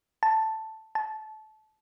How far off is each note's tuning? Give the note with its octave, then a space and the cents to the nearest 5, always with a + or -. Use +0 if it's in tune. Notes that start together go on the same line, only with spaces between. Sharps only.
A5 +0
A5 -25